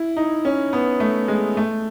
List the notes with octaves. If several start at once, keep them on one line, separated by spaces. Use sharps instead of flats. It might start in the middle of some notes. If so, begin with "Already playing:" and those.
Already playing: E4
D#4
C#4
B3
A3
G#3
A3